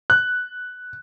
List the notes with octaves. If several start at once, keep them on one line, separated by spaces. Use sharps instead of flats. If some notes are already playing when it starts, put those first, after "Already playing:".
F#6